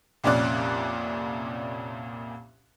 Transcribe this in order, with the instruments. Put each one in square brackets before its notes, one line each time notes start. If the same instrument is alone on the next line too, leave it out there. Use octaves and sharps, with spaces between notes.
[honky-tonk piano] C2 F2 A#2 C#4 D5 F#6